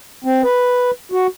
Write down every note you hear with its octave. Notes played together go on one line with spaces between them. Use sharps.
C4
B4
F#4